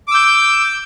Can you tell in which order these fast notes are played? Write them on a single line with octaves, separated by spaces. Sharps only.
D6 E6 G6